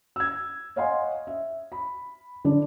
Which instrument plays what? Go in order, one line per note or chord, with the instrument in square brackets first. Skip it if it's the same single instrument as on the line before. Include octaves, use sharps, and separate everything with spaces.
[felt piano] E6 G#6
C#5 D#5 F5 F#5 G#5 C6
E5
B5
D3 D4 D5